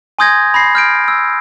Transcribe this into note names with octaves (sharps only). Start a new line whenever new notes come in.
G#5 C6 D#6 G6 G#6 A#6
B5 A#6 C7
F6 G6 D7
E6